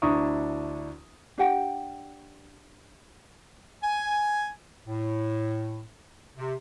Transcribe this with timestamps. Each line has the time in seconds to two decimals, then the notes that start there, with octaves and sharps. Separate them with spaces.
0.02 D2 D4 E4 A#5 C#6 D#6
1.38 D4 G4 F#5 G5
3.83 G#5
4.86 A2
6.37 C3